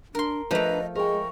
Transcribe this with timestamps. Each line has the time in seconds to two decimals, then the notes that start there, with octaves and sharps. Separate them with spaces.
0.15 D4 A#4 C6
0.51 F3 A3 D4 B4 D#5 A#5
0.95 G#3 A#4 G5 C#6